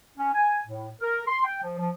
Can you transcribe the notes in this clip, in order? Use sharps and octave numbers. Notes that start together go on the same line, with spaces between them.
C#4
G#5
A2
A#4
C6
G5
F3
F3